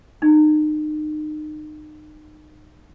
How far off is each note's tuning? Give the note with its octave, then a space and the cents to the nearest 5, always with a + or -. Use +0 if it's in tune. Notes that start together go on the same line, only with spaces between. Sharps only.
D#4 -35